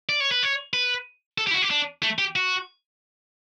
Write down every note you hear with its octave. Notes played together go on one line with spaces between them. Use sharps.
D5
C#5
B4
C#5
B4
A4
G4
E4
F#4
G4
D4
A3
G4
F#4